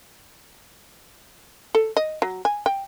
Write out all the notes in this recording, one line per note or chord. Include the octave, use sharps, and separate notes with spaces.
A4
D#5
F#3
G#5
G5